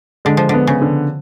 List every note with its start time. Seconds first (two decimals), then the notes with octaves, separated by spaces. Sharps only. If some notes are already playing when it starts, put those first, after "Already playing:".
0.25 D3 G#3
0.37 F3
0.49 D3 B3
0.67 C#3
0.82 D3